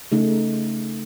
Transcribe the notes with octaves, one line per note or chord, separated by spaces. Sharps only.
C#3 A3 D#4